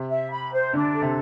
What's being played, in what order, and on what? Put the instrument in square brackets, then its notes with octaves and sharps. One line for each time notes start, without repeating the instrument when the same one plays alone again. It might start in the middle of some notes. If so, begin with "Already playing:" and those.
Already playing: [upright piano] C3
[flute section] E5
B5
C5
[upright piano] D3 [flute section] D4
[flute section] A4
[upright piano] C3